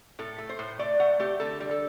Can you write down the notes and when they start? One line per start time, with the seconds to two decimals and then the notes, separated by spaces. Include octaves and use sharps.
0.19 A2 A4
0.38 A3
0.49 C5
0.59 A2
0.79 A3 D5
1.00 A3 F#5
1.19 A3 G4
1.40 D3 A4
1.60 G3
1.71 A4